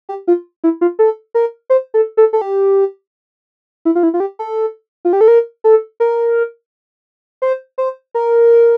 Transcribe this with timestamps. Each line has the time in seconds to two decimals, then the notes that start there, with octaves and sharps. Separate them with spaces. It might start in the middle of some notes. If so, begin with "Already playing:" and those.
0.09 G4
0.27 F4
0.64 E4
0.81 F4
0.99 A4
1.35 A#4
1.70 C5
1.94 A4
2.17 A4
2.33 A4
2.41 G4
3.85 E4
3.95 F4
4.03 E4
4.14 F4
4.20 G4
4.39 A4
5.05 F4
5.13 G4
5.21 A4
5.28 A#4
5.64 A4
6.00 A#4
7.42 C5
7.78 C5
8.15 A#4